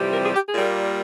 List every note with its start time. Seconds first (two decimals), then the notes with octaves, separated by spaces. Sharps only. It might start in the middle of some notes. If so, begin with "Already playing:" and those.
Already playing: F2 C3 E3 G3
0.12 A#4
0.23 G#4
0.34 G4
0.45 G#4
0.54 A#2 G3 A#3